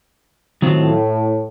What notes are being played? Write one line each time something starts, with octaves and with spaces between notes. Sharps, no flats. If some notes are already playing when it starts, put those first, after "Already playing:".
A2 D#3 F#3 C4 F4